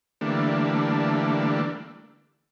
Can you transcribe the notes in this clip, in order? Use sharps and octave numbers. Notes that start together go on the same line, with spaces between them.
D3 E3 G3 A3 A#3 D4